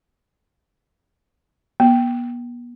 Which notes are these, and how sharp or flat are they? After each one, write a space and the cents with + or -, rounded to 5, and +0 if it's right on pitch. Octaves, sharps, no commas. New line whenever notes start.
B3 -40